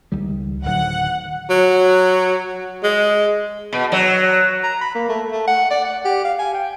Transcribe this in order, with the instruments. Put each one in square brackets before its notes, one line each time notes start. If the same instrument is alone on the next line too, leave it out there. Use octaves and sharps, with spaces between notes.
[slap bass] C#2 D#3 G3
[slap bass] D1 D#3 F#3 [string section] F#5
[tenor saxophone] F#3
G#3
[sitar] B2
F#3
[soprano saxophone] A#5
B5
A#3
A3
A3
F#5
D5
F#5
G4
F5
G#5
G5